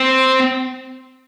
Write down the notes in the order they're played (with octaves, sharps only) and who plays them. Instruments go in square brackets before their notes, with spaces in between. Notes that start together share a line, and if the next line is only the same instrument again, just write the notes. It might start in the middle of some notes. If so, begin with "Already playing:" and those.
Already playing: [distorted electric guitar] C4